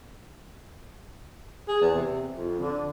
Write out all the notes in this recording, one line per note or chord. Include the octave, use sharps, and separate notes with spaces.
G#4
E2
C3
F2
D3